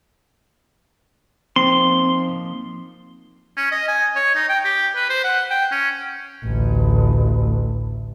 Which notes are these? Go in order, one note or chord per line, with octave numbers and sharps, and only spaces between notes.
F3 A#3 C4 D#4 C6
C#4
D#5
G#5
C#5
D#4
G5
G4
B4
C5
F#5
G5
C#4
A1 D2